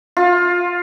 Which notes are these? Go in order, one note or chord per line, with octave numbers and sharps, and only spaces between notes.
F4